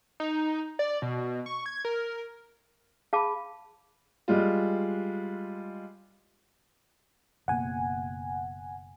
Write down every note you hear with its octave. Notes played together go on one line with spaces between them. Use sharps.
D#4
D5
B2
C#6
G#6
A#4
G#4 F5 A5 B5 D6
G3 G#3 F4
F#1 B2 A#3 F#5 G#5